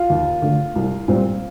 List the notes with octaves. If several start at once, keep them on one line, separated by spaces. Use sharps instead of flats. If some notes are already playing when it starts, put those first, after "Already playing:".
Already playing: F4
D#2
D3 A3
C2
A#2 G3 C4